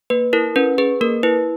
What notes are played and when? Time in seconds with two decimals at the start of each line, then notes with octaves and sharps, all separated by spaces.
0.10 A#3 B4
0.33 E4 A#4
0.56 C#4 B4
0.78 G#4 B4
1.01 A#3 A#4
1.23 E4 B4